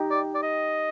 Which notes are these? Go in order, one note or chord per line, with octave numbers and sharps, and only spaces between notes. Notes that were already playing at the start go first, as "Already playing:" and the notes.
Already playing: D#4 G4
D5
D5
D#5